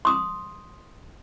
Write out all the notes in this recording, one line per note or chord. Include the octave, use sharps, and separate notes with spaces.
C6 D#6